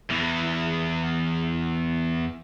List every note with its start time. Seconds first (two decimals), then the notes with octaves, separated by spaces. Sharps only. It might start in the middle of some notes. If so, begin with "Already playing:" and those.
0.10 E2 E3